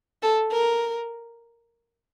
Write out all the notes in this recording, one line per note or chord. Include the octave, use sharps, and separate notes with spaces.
A4
A#4